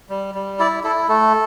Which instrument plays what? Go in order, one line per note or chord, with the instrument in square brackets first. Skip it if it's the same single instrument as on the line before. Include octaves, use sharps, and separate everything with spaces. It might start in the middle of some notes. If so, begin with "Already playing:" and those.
[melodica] G3
G3
E4 D5
E4 A4
A3 A4